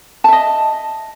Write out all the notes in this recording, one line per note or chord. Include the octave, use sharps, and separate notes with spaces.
D#5 E5 A5